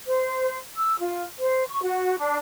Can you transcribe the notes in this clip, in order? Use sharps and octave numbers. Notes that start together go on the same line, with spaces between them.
C5
E6
F4
C5
C#6
F#4
D4